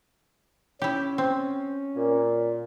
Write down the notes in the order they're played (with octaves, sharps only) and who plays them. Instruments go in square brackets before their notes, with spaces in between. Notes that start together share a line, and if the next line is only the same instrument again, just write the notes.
[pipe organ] C#4 [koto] E4 G4
[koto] C4
[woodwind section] A#2